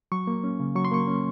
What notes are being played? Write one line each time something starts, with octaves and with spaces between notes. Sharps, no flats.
F#3 C#6
A#3
C#4
C#3
F#3 C#6
C6
A#3 C#6
C#4